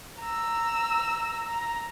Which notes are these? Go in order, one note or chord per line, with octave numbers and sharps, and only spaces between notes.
A#5 E6
A#5